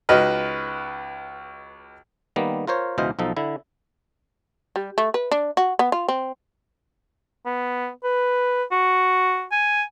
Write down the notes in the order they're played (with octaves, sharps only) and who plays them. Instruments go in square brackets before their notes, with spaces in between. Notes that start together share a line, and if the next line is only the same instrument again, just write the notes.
[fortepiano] C#2 D#4 F#4 B4 D#5 F6
[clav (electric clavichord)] D#3 G3 A#3 B3
F4 A#4 C5 C#5
C#2 B2 E3 C5 D#5 F5
B1 F3 D#4 A4
D3 E4
[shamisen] G3
A3
B4
D4
F#4
B3
F4
C4
[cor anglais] B3
B4
F#4
G#5